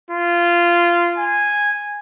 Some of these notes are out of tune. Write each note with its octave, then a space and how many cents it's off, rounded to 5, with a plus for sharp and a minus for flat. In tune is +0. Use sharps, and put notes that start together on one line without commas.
F4 -15
G#5 -10